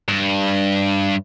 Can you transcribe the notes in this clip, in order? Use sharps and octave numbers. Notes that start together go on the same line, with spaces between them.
G2